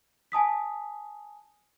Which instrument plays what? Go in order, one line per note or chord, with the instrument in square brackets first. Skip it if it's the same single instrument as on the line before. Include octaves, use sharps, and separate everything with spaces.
[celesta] G#5 A5 D#6 B6